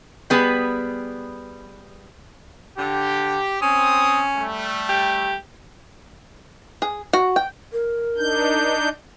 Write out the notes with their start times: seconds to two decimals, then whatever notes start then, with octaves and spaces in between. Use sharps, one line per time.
0.30 G3 B3 G#4 B4
2.78 D3 G4
3.62 C4 C#4 D#6
4.36 G3 A3
4.89 G4
6.82 G#4
7.13 F#4
7.36 G5
7.73 A#4
8.18 D4 D#4 G6